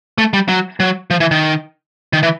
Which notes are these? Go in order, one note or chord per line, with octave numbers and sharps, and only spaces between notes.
A3
G3
F#3
F#3
F3
E3
D#3
D#3
E3